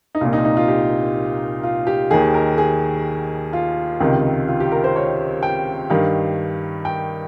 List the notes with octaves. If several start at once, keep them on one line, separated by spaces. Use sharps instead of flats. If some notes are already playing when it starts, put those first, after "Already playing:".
D#4
C2 A#2 F4
D#4
D#4
F4
G4
F4
G4
D#2 D#3 G#4
A#4
G#4
F4
C#2 C3 D#3
F4
G4
A#4
C5
C#5
G5
G2 D#3 F5
G5